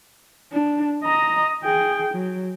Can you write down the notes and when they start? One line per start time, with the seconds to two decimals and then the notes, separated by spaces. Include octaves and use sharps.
0.53 D4
1.04 D#5 A#5
1.63 G#4 G5
2.14 F#3